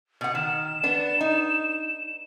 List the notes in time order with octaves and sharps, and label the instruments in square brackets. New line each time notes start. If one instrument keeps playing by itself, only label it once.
[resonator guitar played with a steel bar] B2 F#5
[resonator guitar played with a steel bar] D#3 [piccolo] E7
[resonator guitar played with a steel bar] B3 D4
D#4